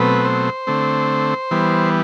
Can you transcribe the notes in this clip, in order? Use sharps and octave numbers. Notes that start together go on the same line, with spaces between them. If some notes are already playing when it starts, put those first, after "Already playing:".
Already playing: B2 F#3 A3 C4 B4
C5
D3 A3 C4
E3 G3 B3